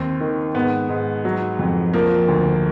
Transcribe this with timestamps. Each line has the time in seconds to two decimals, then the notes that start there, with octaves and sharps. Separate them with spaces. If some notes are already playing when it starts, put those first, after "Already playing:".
Already playing: D#2 C4
0.20 D#3
0.55 G#2 B3
0.89 G#2
1.25 F#3
1.59 F2
1.94 F3 A#3
2.28 D2